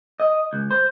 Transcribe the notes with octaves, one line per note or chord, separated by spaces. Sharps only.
D#5
C#2
C5